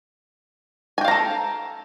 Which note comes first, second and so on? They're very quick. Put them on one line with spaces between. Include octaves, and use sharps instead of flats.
G#5 G5 F5 A#5 A4